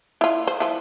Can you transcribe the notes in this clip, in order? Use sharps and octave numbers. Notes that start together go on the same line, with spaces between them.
E4 F4
C5
F3 E4